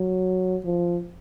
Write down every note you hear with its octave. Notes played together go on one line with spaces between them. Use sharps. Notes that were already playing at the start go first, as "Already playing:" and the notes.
Already playing: F#3
F3